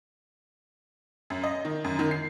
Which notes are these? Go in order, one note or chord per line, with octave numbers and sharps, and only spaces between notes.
F#2
D#5
D#3
F#2
D#3
C7